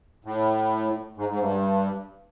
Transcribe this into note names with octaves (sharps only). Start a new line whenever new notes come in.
A2
G#2
G#2
G2